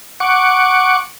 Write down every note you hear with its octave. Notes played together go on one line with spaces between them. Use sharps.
F#5 C#6 D6